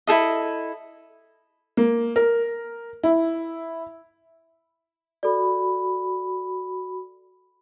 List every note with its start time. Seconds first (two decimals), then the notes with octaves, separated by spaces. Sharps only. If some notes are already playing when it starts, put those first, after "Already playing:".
0.07 E4 G#4 A4 D#5
1.77 A#3
2.16 A#4
3.03 E4
5.23 F#4 A4 D5 B5